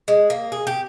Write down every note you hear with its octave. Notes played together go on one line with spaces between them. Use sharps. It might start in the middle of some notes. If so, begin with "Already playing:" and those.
G#3
A#3
G#4
G4